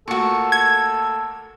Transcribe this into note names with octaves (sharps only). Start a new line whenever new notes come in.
A#2 A3 A#3 F#4 A4 C#6
G#6